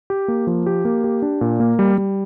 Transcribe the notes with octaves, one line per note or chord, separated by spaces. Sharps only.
G4
A#3
F3
G4
A#3
G4
D4
A#2
A#3
G3
G3